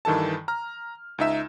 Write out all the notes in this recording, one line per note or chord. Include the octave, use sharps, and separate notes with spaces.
G2 D#3 E3 A4 A5
A#5 F6
C#2 D#4 E5 E7